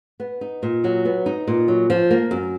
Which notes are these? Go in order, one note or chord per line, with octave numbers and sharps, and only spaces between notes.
B3
D#4
A#2
F#3
B3
D#4
A#2
F#3
F3
A#3
F#2